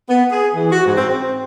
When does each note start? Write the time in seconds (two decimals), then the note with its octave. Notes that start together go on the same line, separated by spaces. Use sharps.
0.09 B3
0.31 G#4
0.54 E3
0.70 F#4
0.85 G#2
0.97 C4
1.09 C4